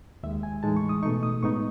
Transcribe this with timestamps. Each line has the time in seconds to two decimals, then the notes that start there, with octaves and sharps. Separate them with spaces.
0.23 D#2 D#3 G#3 E5
0.43 G#5
0.63 A2 E3 G#3 D#4 A5
0.77 C#6
0.89 D#6
1.03 D#4 C#6
1.05 B2 A3
1.23 D#6
1.43 A2 G#3 B3 D#4 C#6